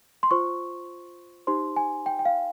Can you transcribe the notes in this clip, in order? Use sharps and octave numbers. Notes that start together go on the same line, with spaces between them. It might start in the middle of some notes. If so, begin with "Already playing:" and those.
C6
F4 C5 C#6
D#4 G4 C5 C6
G#5
G5
G5
F5